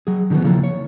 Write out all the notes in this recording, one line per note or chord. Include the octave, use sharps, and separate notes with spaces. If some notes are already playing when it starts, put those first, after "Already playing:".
F#3 G#4
D3 D#3 F3 F#3 B3
C#3 F3 A#3 E4 A4
C#5